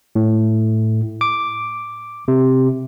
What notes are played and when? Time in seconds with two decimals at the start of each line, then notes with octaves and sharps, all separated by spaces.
0.15 A2
1.21 D6
2.28 C3